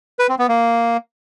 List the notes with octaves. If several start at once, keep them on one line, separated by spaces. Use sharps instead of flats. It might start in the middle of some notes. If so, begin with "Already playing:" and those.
B4
C4
B3
A#3